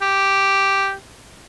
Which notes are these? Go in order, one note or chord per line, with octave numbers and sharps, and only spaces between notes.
G4